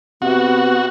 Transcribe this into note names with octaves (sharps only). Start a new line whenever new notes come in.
C3 B3 F#4